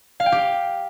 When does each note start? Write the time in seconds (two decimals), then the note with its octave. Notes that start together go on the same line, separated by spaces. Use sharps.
0.20 F5
0.26 G5
0.32 G4